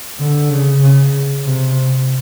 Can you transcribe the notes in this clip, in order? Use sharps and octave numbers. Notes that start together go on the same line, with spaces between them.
D3
C#3
C#3
C3